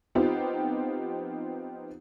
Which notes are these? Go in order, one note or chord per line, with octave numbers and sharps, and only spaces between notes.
F3 B3 C4 D#4 F4 G4